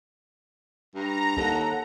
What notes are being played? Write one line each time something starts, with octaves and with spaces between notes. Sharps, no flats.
G2 A#5
D#2 D#4 A4 F#5